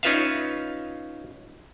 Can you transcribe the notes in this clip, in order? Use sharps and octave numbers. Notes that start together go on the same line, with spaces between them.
C#4 D#4 F4 B4 E5 F5